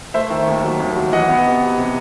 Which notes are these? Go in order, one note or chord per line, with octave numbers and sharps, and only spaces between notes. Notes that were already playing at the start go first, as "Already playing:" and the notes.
A3 C5 E5
D#3
D#2
F#3
D#2
F#3
E3 D#5 F#5
B3
C3
C3
C3